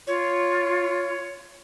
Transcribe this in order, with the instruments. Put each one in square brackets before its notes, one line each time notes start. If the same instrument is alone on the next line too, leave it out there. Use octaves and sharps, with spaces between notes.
[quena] F4 [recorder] C#5